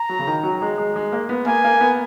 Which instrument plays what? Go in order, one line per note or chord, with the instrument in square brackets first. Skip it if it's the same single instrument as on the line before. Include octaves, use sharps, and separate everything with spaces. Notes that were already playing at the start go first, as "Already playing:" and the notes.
Already playing: [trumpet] A#5
[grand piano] F#3
C#3
D#3
F#3
G#3
G#3
G#3
A#3
B3
[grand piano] A#3 [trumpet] G#5
[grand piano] A#3
B3